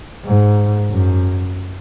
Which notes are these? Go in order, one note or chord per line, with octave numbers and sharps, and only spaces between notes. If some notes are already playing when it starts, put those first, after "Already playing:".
G#2
F#2